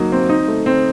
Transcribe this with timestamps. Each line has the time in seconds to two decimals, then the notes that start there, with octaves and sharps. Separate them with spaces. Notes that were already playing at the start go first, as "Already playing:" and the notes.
Already playing: F#3 A#3 D#4
0.12 C4
0.29 D#4
0.48 A3
0.66 C4